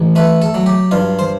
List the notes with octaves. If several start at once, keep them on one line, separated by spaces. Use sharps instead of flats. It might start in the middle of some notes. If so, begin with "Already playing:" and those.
Already playing: A1
A3 B4
A4
F#3
G4
G2 F4
C5